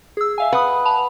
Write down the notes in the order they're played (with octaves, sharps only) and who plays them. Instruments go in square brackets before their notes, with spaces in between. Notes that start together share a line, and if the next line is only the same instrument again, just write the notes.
[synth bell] G#4 E6
E5 F5 G#5
[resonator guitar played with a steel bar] B4 [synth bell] F#5 D#6
[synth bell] A5 B5 F7